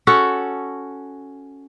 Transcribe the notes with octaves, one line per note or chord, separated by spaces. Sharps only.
C#4 F#4 A4